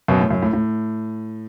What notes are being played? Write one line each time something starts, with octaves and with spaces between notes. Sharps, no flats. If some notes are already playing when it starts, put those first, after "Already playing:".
F#2 B2
A2
F#2
A2
A2